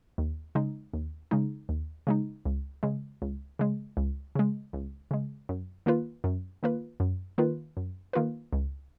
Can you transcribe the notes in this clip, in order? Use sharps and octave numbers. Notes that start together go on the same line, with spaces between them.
D#2
C#3 G#3 D#4
D#2
C#3 G#3 D#4
D#2
C#3 G#3 D#4
C#2
C#3 G#3
C#2
C#3 G#3
C#2
C#3 G#3
C#2
C#3 G#3
F#2
D#3 A#3 F4 B4
F#2
D#3 A#3 F4 B4
F#2
D#3 A#3 F4 B4
F#2
D#3 A#3 F4 B4
C#2